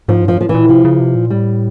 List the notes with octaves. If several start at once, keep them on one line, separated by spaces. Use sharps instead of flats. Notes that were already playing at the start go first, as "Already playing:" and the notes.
G#2 F3
G2
F3
F3
E3
A#2
C3 F3
C#3
C3
A#2
A2 G3